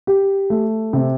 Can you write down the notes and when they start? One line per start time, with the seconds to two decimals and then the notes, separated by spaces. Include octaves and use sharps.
0.07 G4
0.50 A3
0.93 C3